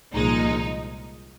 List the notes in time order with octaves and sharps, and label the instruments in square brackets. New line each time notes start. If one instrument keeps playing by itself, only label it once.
[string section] C2 A#2 F3 G#3 D#4